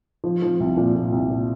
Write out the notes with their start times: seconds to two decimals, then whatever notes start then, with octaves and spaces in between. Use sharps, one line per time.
0.24 F3
0.42 F3
0.60 C2
0.77 A#2
0.96 A#2
1.12 C2
1.30 A#2